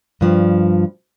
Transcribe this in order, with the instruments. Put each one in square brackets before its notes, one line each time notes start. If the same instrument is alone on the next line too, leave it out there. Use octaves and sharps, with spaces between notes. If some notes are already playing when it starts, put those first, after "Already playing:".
[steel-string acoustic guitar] G2 F3